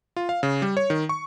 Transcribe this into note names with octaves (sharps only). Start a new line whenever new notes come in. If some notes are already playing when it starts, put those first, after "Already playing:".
F4
F5
C#3
G3
C#5
D#3
C#6